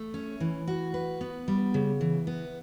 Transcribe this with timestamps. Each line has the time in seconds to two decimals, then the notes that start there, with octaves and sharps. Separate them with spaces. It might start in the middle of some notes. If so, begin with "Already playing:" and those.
Already playing: A3
0.14 C#4
0.40 E3
0.67 F#4
0.94 B4
1.21 B3
1.48 G3
1.74 C#3
2.01 E3
2.27 B3